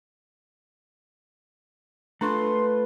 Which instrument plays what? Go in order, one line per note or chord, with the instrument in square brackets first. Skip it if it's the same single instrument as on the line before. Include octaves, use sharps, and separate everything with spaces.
[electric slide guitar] A3 F4 A4 [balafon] D4 C#6 [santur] B4 [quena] C6